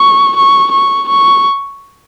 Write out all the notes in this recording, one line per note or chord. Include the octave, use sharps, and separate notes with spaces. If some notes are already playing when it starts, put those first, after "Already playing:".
Already playing: C#6
C#6
C#6
C#6